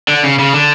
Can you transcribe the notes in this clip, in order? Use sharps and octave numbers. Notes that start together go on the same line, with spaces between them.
D3
C#3
C#3
D3